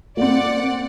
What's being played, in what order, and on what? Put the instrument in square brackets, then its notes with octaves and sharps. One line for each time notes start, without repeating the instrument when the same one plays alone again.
[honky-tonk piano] A#3 C4 [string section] D5 F#5